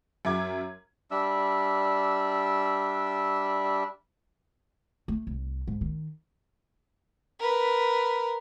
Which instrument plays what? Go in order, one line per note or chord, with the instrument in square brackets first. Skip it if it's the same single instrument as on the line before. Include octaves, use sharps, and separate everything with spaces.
[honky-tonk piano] F#2 E5 D6 G#6
[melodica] G3 D4 E5 E6
[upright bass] A3
C2
G#2
D#3
[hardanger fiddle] A#4 B4